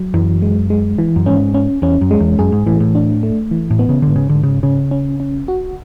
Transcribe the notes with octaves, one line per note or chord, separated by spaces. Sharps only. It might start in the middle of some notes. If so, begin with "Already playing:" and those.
Already playing: F#3
F#2 E3
G#3
G#3
E3
F#2
G#2 C#4
C#4
E2 C#4
F#2
G#3
E2
F#2 G#4
G#2
A2 E3
A2
D4
A3
E3
A2
B3
C#3
G#2 D3
C#3
D3
G#2
C#3
C#3 C#4
C#4
C#4
F#4